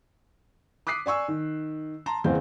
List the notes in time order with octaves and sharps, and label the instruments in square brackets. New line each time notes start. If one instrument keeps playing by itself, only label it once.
[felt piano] D6 D#6 F#6 B6 C7
D5 G#5 C#6 E6
D#3
A5 A#5 C6
F#1 E2 C4 F5 G6